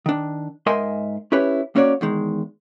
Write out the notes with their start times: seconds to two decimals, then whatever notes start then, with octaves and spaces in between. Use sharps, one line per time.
0.06 D#3 D4
0.66 G#2 A#4 D#5 E5 G#5 C6
1.32 C#4 E4 G4 B4 C#5
1.76 A#3 C#4 F#4 C#5 D5
2.01 E2 D#3 G#3